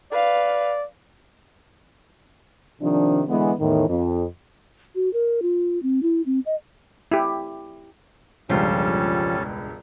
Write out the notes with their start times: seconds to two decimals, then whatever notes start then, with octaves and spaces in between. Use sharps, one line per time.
0.12 B4 D5 F5
2.81 C3 D#3 F3 D4
3.28 D3 E3 G#3 B3
3.59 E2 A2 D#3
3.88 F2
4.95 F#4
5.13 A#4
5.42 F4
5.83 C4
6.03 E4
6.26 C4
6.46 D#5
7.12 E4 G4
8.49 E1 C#2 G2 F3 G3 C#4 A4